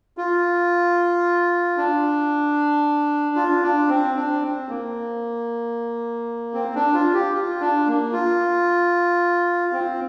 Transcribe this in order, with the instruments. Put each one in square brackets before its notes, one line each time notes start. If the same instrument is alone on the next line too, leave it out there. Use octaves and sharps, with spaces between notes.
[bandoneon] F4
D4
F4
D4
C4
D4
C4
A#3
C4
D4
F4
G4
F4
D4
A#3
F4
C4